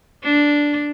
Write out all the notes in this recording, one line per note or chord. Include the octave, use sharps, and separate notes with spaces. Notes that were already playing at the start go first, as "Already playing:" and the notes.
D4